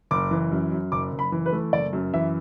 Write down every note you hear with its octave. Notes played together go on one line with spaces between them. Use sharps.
F#1 D6
E3
F#2
F#2
F#1 D6
F#1
B5
E3
B4
A3
F#1 D5
F#2
E3 E5